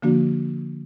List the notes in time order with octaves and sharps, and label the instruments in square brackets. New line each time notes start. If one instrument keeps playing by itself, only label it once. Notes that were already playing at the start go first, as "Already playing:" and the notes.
[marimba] D3 F3 A#3 D4 F#4